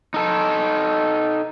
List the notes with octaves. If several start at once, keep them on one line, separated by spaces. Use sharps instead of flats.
D#4 A4